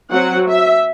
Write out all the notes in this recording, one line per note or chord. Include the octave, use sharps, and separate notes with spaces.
F#3 C4 F#5
E5